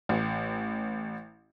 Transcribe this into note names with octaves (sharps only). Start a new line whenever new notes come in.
A1